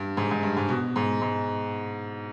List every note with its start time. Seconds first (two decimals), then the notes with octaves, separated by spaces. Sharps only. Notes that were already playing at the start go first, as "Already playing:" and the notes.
Already playing: G2
0.17 G#2
0.31 G#2
0.43 G2
0.56 G#2
0.69 B2
0.96 G#2
1.21 G#2